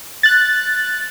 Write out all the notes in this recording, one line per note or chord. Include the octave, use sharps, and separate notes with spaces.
F#6 A6